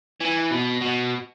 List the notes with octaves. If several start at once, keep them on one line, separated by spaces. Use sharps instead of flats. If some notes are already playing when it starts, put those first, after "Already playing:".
E3
B2
B2